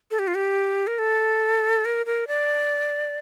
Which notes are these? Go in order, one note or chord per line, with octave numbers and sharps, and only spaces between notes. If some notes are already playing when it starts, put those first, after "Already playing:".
A4
G4
F4
G4
A#4
A4
A#4
A#4
D5